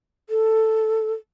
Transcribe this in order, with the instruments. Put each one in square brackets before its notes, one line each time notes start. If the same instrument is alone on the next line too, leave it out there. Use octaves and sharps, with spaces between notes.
[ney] A4